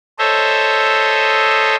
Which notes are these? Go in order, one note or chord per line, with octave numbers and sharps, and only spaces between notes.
A4 C5 C#5 D#5 E5